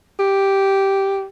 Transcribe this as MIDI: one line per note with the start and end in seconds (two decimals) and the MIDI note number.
0.19 1.26 67